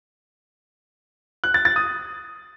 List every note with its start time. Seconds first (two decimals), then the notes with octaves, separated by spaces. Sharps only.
1.44 F#6
1.54 A6
1.65 A6
1.76 D#6